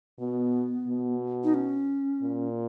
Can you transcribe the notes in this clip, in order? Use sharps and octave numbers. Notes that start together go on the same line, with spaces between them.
B2 B3
B2
D#4
C#4
A#2